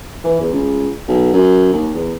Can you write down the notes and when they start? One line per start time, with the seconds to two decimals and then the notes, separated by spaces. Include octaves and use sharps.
0.24 E3
0.40 E2
0.52 C#2
1.07 B1
1.33 F#2
1.73 D#2
1.94 E2